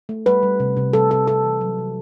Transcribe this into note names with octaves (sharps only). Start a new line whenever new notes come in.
A3
G3 B4
G3
C3
C3
G3 A4
C3 A4
C3 A4
E3
F#3
C3